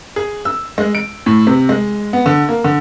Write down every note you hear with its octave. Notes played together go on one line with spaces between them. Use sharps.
G#4
E6
G#3
D7
A2
C3
G#3
B3
D3
A#3
D3